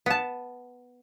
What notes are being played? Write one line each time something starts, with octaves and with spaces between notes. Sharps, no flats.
B3 A5